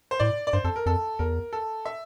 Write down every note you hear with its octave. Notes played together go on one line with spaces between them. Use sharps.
C5
A2 D5
D5
G2 C5
F2 A4
A#4
F2 A4
E2 A#4
A4
E5